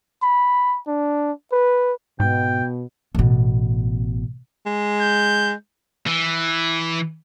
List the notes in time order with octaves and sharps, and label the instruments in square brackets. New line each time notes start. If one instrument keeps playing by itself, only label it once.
[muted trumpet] B5
D4
B4
[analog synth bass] G#2 [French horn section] B2 [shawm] G5
[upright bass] A1 B2
[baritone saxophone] G#3
[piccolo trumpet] G6
[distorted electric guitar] E3